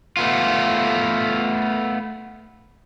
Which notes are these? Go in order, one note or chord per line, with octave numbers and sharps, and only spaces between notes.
A3 B3 F4